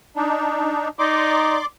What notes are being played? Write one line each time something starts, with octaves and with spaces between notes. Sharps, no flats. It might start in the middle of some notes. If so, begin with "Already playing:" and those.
D4 D#4
D#4 D5 C6 D6